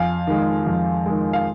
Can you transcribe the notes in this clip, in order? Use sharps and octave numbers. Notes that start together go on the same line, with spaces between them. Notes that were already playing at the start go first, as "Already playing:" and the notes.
Already playing: F2 F5 G#5
D#3 G#3
F2
D#3 G#3
F5